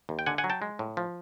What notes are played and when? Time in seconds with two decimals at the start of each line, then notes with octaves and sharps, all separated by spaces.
0.09 D#2
0.19 G5
0.26 D3 F#5 G#5
0.38 F#5 G#5
0.44 F#3
0.50 G5 A5
0.62 G#3
0.79 A2
0.97 F3